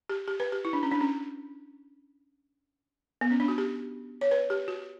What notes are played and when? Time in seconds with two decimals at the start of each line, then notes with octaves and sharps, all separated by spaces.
0.09 G4
0.28 G4
0.40 B4
0.52 G4
0.65 E4
0.73 D4
0.83 C#4
0.91 D4
1.01 C#4
3.21 B3
3.31 C#4
3.40 D4
3.48 F#4
3.58 G4
4.21 C#5
4.31 B4
4.50 G4
4.68 F#4